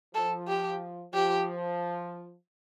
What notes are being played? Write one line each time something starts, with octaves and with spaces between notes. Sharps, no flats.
F3 A4
G4
F3 G4